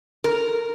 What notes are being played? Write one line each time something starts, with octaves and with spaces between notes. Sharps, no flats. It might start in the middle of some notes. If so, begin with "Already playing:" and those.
A#4